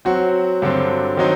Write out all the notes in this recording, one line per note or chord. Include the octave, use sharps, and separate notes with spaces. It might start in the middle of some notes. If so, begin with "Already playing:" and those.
F#3 C4 F#4
G2 D3 F#3 C4
D#3 F#3 C4 D#4